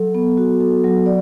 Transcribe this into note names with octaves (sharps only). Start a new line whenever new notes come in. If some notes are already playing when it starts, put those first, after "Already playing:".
Already playing: F#3 A4
B3
F#4
A4
F#3
D5